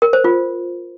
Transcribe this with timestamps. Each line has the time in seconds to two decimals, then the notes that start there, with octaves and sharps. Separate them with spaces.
0.02 A#4
0.13 C5
0.24 F4